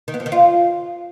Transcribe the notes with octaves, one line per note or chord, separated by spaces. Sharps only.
D#3
B3
F3
D#3
F4